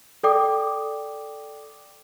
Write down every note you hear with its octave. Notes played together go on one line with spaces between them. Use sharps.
A4 D5 G5 D6 D#6